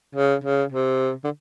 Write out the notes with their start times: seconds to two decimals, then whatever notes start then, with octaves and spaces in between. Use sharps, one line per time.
0.15 C#3
0.44 C#3
0.72 C3
1.24 D3